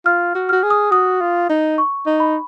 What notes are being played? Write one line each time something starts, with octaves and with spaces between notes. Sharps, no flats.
F4 F6
F#4
F#4 F6
G#4
D#6
F#4 D#6
F4
D#4
C#6
D#4
B5